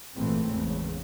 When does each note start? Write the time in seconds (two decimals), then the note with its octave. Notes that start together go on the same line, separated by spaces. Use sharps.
0.15 G#1 A#2 E3 A3 C4
0.47 G#1 E2 C#3